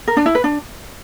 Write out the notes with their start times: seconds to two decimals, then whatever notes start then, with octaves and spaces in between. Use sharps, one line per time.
0.08 A#4
0.17 D4
0.26 E4
0.35 B4
0.44 D4